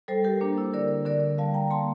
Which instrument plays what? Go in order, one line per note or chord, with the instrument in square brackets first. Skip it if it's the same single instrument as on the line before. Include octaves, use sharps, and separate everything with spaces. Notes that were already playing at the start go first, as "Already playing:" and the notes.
[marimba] G3 A4 C5
G4 A#4
A#3 D4
E4
D3 A#4 D5
D3 A#4 D5
G3 F5 A5
G5 A#5
A#3 A5 C6